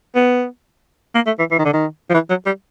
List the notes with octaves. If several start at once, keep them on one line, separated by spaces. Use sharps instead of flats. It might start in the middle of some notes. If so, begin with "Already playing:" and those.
B3
A#3
A3
E3
E3
D#3
D3
D#3
F3
E3
F#3
G3